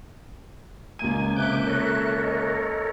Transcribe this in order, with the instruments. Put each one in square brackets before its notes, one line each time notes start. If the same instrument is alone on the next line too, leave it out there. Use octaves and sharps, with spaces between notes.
[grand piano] C#2 A#3 D#7 [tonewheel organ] G#5
[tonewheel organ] C3 D6 G6 [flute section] E5 F#6
[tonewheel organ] A4 A#4 C#5
[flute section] D#5